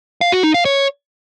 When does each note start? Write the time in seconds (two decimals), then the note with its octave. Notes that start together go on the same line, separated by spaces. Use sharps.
0.21 F5
0.32 F#4
0.43 D#4
0.54 F5
0.65 C#5